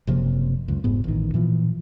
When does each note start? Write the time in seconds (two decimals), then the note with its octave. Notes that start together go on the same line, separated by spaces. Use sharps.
0.07 F#1 C3 F3 A#3
0.68 C#2 F#2
0.84 F1 G#2 B3
1.04 A1 D#3
1.34 A#2 E3 F3